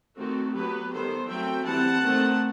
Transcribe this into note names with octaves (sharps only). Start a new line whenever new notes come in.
D#3 A3 C4 F#4 A4
F#3 B3 G4 B4
D#3 G3 B3 A4 C5
F#3 A3 C4 E5 G5
E3 G3 C4 F#5 A5
D#3 A3 C4